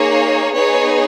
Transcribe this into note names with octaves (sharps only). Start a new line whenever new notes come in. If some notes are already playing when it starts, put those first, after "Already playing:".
Already playing: A#3 D#4 G#4 C#5
B3 D#4 G#4 C#5